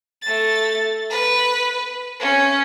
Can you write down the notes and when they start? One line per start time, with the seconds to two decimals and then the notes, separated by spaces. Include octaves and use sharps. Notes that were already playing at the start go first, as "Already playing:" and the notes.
0.23 A3 A6
1.10 B4
2.20 C#4